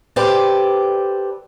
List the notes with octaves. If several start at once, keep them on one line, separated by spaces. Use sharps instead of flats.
G4 A4 B4 C5 D5